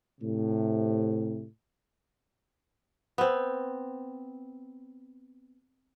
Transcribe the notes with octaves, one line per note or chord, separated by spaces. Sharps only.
A2 C3
B3 C4